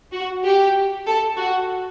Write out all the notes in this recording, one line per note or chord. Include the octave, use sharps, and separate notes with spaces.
F#4
G4
A4
F#4